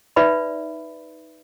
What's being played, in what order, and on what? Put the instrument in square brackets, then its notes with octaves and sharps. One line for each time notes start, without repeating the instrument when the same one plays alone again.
[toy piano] D#4 B4 D5 E5 B5